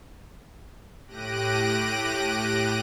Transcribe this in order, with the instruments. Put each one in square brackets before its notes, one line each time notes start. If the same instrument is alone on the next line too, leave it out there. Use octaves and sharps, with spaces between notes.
[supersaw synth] A2 G4 F#6 A#6 D7 D#7